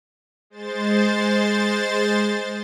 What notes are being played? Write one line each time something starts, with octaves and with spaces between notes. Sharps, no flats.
G#3 C5 A6